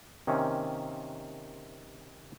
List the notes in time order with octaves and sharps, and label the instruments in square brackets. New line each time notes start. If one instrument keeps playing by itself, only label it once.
[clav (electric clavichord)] C3 D#3 A#3 C4 C#4